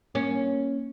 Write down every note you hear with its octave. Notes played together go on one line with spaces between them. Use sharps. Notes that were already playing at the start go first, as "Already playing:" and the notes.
A#3 C#4